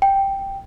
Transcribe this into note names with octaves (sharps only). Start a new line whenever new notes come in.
G5